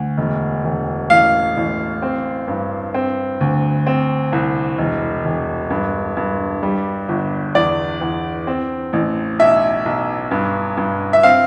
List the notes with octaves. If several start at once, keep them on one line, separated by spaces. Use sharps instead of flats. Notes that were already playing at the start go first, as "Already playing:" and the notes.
Already playing: D2
E1
E1
A1 F5
A1
C4
G2
C4
D2
C4
C2
E1
E1
G2
G2
G3
G1
E2 D5
E2
C4
A1
B1 E5
B1
G2
G2
E5
C4 F5